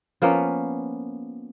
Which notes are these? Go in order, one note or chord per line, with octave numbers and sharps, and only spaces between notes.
F3 A#3 B3 C#4